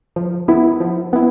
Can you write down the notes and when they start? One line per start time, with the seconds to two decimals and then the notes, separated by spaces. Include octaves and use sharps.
0.16 F3
0.48 B3 E4
0.80 F3
1.13 B3 E4